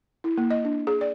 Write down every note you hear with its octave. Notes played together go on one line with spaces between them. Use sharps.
E4
A#3
D#5
D4
G#4
D5